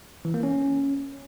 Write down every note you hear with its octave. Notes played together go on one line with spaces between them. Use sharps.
E3
A#3
C#4